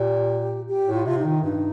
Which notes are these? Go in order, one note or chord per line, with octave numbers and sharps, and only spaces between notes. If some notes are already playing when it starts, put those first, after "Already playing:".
Already playing: A#2 G4
G4
A2
F4
C3 F4
D#4
D#3
G2 D#4